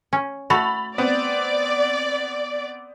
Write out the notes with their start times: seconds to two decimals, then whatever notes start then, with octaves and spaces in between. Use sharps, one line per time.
0.13 C#4
0.50 A3 F#4 B5 A6 F7
0.98 B3 C4 D5